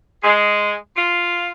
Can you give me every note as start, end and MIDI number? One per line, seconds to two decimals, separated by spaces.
0.24 0.74 56
0.96 1.50 65